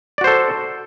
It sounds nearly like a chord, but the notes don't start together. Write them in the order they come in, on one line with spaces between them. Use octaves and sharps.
D5 F#4 C5 A4